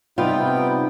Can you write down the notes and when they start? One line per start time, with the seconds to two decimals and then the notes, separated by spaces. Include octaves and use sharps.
0.18 C3 G3 B3 C4 D#4 F4 G5